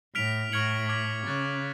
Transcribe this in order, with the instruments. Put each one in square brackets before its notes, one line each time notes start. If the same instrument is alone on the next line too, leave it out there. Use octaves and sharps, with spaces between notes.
[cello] A2 [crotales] F6 B6 D7 F7
[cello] A2 [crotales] C#6 F6 G#6 C#7 F#7
[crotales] D6 F6 G#6 B6 D7
[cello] C#3 [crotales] C#6 F#6 A6